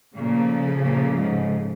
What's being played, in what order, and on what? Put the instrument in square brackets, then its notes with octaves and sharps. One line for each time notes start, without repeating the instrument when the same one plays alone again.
[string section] A#2 [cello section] C#3 F3 A3
[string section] A#2
G#2